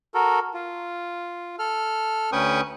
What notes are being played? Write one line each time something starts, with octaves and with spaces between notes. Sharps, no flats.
F#4 A4 A#4
F4
A4 F6
D2 C#4 B4 G5 C#6 D#6